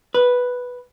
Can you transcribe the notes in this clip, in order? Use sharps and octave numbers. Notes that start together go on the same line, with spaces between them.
B4